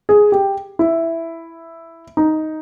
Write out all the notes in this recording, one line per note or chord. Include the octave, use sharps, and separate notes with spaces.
G#4
G4
E4
D#4